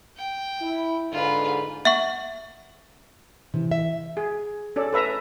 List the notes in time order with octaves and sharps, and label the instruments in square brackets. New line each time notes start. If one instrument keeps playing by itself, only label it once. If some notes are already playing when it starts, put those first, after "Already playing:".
[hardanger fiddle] G5
[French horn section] E4
[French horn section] G#2 D3 [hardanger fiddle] F4 B4
[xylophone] E5 F#5 C#6
[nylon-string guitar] C3 [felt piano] E3
[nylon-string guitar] E5
[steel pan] G#4
C#4 A4 D5
A4 B4 E5 A#5